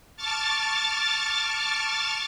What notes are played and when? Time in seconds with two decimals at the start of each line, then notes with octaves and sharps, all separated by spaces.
0.17 A5 C#6 D6 F6 A6